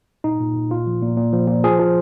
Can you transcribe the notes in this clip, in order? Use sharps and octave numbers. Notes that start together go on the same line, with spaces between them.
A#2 D#4
A#2
A#2
A#2 F4
F3
A#2
A#2
F3
A#2
F3 G#4
F3